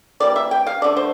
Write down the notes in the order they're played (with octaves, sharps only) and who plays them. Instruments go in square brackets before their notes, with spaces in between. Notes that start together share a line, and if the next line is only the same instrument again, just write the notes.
[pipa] E3 G3 A#3 D5
E5
G5
F5
D3 A3 D5
C5